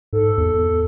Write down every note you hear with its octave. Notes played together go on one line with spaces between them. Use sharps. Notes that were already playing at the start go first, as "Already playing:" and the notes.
G#2 A4
E2